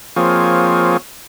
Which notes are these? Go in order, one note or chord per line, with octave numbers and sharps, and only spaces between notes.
F3 A#3 C4 F4 G#4 C#5